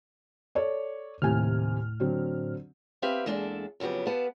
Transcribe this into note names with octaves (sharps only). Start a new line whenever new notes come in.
A4 C#5 D5
D#2 A2 C3 G#5 F6
D3 F#3 C4
B3 C4 G4 B4 E5 F5
E2 G#3 A#3 D4 A4 E5
F2 C#3 F#3 B3 G4
B3 G4 B4 F5 F#5 A5